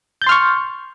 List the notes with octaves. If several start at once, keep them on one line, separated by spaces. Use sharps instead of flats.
C6 C#6 F6 G6 A6